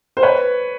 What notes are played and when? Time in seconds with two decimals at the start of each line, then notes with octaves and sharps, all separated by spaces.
0.17 C5
0.23 B4 C#5